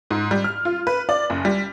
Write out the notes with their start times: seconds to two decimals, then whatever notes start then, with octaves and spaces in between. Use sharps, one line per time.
0.11 G#2
0.31 G3
0.44 F6
0.65 F4
0.87 B4
1.09 D5
1.30 F#1
1.45 G3